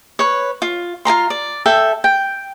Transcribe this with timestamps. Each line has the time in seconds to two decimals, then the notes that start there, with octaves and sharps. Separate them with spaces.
0.19 B4 C#5
0.62 F4
1.05 F4 B4 A#5 C6
1.30 D5
1.66 A4 E5 G5
2.04 G5